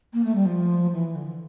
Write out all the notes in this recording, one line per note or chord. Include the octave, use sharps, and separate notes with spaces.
A#3
A3
G3
F3
E3
D3